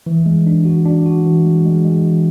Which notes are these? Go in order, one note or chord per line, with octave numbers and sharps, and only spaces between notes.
E3
G#3
D4
F#4
D4
F#4
E3
G#3
G#3
G#3
E3